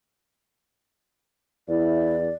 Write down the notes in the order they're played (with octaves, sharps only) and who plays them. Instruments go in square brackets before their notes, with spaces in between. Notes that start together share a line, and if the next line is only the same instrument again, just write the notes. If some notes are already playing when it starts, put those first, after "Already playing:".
[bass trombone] E2 [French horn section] E4 [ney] D5